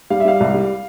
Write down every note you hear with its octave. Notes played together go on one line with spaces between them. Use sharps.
G3 F5
E5
G3 F5
C2
G3